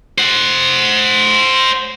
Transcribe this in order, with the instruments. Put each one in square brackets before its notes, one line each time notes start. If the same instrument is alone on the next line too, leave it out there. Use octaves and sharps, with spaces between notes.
[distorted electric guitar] C5 F#5